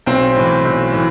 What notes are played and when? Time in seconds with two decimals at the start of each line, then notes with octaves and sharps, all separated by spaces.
0.06 B1 C4
0.36 A2 E3
0.65 B1
0.93 A2 E3